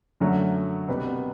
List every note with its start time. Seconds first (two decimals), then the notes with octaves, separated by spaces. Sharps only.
0.20 F#2 D3 F#3 A3 C#4
0.88 C2 B2 G3 B3